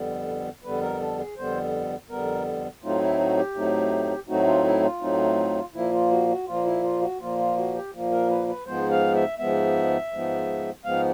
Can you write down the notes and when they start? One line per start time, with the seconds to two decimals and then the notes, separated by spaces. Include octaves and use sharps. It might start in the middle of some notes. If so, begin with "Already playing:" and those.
Already playing: F2 D3 G3 B3
0.64 F2 D3 G3 B3 B4
0.82 A#4
1.00 A4
1.18 G#4
1.37 F2 D3 G3 B3 C5
2.10 F2 D3 G3 B3 A#4
2.83 A2 F#3 A3 C4 D#4 F4
3.01 E4
3.19 F#4
3.37 G4
3.55 A2 F#3 A3 C4 D#4
4.29 A2 F#3 A3 C4 D#4 F#4
4.47 F4
4.65 E4
4.83 F4
5.01 A2 F#3 A3 C4 D#4
5.74 A#2 F3 A#3 E4
5.93 F4
6.11 F#4
6.29 F#4
6.47 A#2 F3 A#3 F4
6.65 E4
6.83 F4
7.01 F#4
7.20 A#2 F3 A#3 F4
7.39 F4
7.57 F#4
7.75 G4
7.93 A#2 F3 A#3
8.11 A#4
8.30 B4
8.48 B4
8.66 G#2 F3 G#3 B3 C5
8.91 F5
9.15 E5
9.39 G#2 F3 G#3 B3 E5
10.12 G#2 F3 G#3 B3
10.85 G#2 F3 G#3 B3 F5